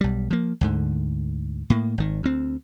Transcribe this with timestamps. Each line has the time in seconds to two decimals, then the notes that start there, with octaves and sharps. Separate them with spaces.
0.01 B1 G3
0.31 F3 A#3
0.61 D2 G#2 D3
1.70 A2 A#3
1.98 G#1 D#3
2.23 D2 C4